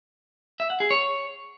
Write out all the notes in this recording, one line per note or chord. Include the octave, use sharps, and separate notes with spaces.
E5
F#5
G#4
C#5